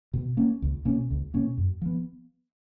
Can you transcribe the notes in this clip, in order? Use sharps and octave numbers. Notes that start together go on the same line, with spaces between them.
B2
A#3 C#4
C#2
B2 A#3 C#4
C#2
B2 A#3 C#4
F#2
F3 B3